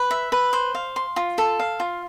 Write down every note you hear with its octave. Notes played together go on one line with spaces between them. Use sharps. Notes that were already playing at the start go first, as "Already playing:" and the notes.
Already playing: B4
E5
B4
C5
F5
C6
F4
A4
F5
F4